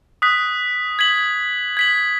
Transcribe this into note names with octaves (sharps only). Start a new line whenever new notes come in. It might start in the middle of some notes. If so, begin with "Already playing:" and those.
D#6 F#6 B6
G#6 B6 F#7
G#6 B6 F#7